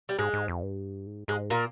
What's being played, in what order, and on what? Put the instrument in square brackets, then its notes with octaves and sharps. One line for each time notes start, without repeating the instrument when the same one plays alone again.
[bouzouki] G3
[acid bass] G#2 [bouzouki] G#3
[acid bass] G#2
F2
G2
G#2
[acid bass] G#2 [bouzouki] G#3
[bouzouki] A#2 A#3